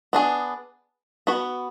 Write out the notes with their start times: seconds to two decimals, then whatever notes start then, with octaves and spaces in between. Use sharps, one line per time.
0.13 B3 D4 G#4
1.27 B3 F#4 B4